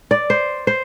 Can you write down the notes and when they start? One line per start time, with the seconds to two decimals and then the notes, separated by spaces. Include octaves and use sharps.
0.11 D5
0.30 C5
0.67 C5